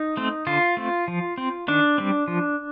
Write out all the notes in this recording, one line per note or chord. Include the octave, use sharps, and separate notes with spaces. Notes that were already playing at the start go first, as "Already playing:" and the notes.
Already playing: D#4
A3 C4
D3 F4
A3 C4
F3
C4
D#3 D4
G3 C4
F3